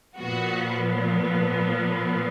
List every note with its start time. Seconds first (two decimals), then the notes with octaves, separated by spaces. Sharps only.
0.18 A#2 F3 B3 F#4